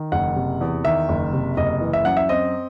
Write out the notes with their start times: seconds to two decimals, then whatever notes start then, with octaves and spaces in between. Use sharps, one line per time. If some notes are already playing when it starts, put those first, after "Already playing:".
Already playing: D#3
0.12 F#1 F#5
0.36 C3
0.61 E2
0.84 D#3 E5
1.09 F#1
1.33 C3
1.57 F#1 D#5
1.81 E3
1.93 E5
2.05 F#2 F#5
2.17 E5
2.29 C4 D#5